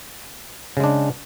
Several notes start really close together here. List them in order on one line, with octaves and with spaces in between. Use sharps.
C#3 G#3 D4